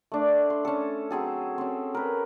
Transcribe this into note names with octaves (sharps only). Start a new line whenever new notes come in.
A3 D4 D5
C6
C#4 A4
F#3 C4 G#4 A4
C4 C#4
A#4 B4